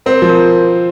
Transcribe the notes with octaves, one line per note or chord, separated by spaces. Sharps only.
C4 A#4
F3
A#4